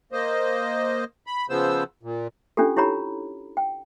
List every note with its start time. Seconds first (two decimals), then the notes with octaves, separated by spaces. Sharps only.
0.12 A#3 C5 D#5
1.27 B5
1.50 C#3 F3 B3 C5 E6
2.03 A#2
2.57 C#4 D4 F4 G4 A4
2.77 E4 G4 C#5 A#5 B5
3.57 G5